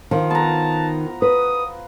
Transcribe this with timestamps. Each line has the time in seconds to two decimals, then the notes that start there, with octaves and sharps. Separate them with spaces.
0.11 D#3 F3 F4
0.30 B3 A5 A#5
1.22 B4 D#6